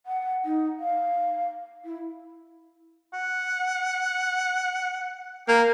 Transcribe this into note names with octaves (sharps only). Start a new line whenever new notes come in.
F#5
D#4
F5
E4
F#5
A#3 G5